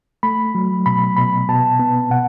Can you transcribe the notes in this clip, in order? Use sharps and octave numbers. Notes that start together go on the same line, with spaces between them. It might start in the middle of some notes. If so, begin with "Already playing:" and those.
A3 B5
F#3
B2 B5
B2 B5
B2 A5
B3
B2 F#5